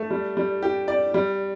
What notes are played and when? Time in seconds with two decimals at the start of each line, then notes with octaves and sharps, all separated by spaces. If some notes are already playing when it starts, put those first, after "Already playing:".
Already playing: A3
0.11 G3
0.37 G3
0.63 G4
0.88 D5
1.14 G3